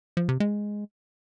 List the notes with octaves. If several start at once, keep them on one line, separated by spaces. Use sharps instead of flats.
F3
C3
G#3